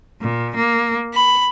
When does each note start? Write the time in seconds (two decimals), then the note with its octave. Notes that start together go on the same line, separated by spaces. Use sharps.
0.21 A#2
0.55 A#3
1.14 B5